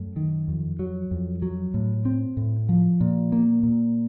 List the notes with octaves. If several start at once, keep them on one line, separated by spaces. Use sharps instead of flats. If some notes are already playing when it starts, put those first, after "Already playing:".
Already playing: F#2 A3
D#3
F2
F#3
F2
F#3
A2
C4
A2
F3
A#2
A#3
A#2